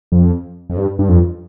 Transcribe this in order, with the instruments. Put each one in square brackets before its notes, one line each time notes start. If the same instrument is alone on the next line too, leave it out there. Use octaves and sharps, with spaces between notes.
[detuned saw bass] F2
F2
G2
G2
F2